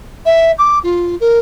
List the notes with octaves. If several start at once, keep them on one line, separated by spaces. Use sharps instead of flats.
E5
D6
F4
A#4